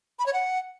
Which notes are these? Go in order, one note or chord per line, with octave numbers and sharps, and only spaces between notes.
B5
C#5
F#5